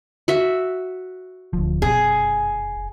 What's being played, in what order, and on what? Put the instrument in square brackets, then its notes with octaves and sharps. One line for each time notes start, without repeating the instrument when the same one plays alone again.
[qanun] F#4 E5
[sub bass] D1 [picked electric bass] D2 F3
[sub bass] F1 [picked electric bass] F#2 B2 [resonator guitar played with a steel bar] G#4